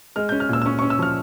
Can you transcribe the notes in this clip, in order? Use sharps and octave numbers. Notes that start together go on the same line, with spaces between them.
G#3 F6
G6
C#4
F6
A#2 E6
E6
C#4 C#6
C#6
C#4
E6
F3 F6